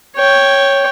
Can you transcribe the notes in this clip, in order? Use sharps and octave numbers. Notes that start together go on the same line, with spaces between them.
C#5 G5